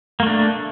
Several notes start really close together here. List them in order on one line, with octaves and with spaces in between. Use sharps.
A#3 A3 D4